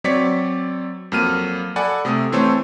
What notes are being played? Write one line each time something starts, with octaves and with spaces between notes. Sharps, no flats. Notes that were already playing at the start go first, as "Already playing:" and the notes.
F#3 C4 C#5 D5 B6 C#7
F2 F#3 A#3 F6 D#7
A4 D5 F#5 G#5 B5
C3 A3 D#6 E6
E3 A3 C4 A4 C5 C#5